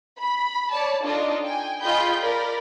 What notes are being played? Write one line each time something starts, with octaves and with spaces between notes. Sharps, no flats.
B5
C#5 D5 A5
D4 D#4 F4 A4 D#5
G5 G#5
F4 G#4 D#5 G5 B5 G6
A#4 D5 B5